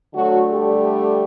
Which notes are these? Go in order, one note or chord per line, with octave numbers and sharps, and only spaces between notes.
D3 F#3 A3 F#4
G3 G4